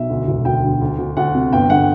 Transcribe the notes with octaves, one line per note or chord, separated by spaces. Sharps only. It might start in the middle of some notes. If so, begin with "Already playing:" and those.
Already playing: B1 E5
D2
E1
D2 G5
D3
D2
D2
D2 F#5
C3
G1 G5
D3 F#5